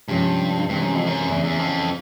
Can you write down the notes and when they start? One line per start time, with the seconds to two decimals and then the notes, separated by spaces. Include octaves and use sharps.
0.08 G2 C3 F3 G#3 C#4
0.69 G2 C3 E3 G#3 C4
0.82 F#2
0.95 F2
1.06 F#2
1.29 E2 C#3 E3 A3 C#4
1.44 E2
1.59 F2